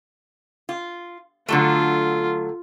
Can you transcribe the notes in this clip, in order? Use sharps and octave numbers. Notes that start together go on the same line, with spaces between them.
F4
D3 F#3 A3 F4